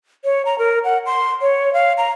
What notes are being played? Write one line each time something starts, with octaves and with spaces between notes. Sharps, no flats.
C#5
A#5
A#4
F#5
C6
C#5
F5
A#5